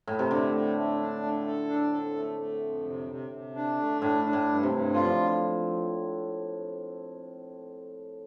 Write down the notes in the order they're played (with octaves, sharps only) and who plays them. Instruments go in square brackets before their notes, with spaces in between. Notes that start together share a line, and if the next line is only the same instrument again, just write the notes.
[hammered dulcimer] A2
C3
[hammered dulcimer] D3 [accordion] A3
[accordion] A3
A3
D4
A3
A4
D4
A4
A3
A3
F2
C3
C3
C3
D4
A3
[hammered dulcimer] A2 [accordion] D4
[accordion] D4
[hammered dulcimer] A2
[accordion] G2
[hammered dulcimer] C3
[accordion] G2
[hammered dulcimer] D3 [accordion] F4
[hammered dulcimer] F3